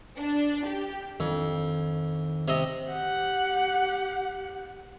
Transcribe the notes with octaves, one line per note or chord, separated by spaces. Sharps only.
D4
G4
F2 D#3 D4
C3 D#5
G4 F#5